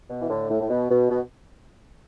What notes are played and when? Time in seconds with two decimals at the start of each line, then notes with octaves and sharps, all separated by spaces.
0.10 B2
0.20 E3
0.30 A2 D3
0.50 A2
0.60 A2
0.70 B2
0.90 B2
1.10 B2